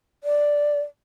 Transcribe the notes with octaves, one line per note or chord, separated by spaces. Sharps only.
D5